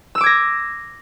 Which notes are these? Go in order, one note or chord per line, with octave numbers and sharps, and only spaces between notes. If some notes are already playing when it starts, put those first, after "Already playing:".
D6 E6 G#6 A#6 E7